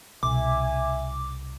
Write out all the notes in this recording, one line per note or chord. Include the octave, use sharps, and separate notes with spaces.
C2 B2 E5 G#5 D6